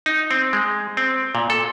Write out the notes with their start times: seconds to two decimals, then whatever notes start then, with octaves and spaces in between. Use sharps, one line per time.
0.06 D#4
0.31 C4
0.53 G#3
0.97 C4
1.35 A#2
1.50 A4